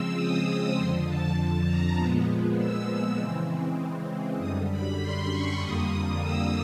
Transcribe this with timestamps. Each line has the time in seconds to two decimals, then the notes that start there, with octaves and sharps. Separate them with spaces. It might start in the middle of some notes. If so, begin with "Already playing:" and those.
Already playing: C#3 F3 G#3 C4 E6
0.14 D#6
0.44 D#6
0.74 F2 D3 F3 C6
1.05 A5
1.34 A5
1.65 A#5
1.95 A#2 F3 G#3 B3
2.56 E6
3.17 C#3 E3 G#3 C4
4.38 F#2 D3 G3 D#6
4.68 B5
4.98 C6
5.29 C#6
5.59 F2 D3 G3 A#3 D#6
6.20 E6